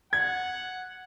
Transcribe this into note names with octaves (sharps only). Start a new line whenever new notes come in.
F#5 G#6